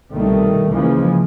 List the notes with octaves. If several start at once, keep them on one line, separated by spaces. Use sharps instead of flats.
C2 B2 D#3 G3 A3
C#2 C#3 E3 F3 G#3 A#3